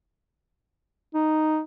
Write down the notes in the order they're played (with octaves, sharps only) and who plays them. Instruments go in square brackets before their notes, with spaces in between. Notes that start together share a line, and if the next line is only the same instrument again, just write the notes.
[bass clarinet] D#4